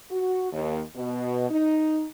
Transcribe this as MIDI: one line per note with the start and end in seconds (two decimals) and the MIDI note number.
0.11 0.49 66
0.52 0.81 39
0.96 1.49 47
1.50 2.04 63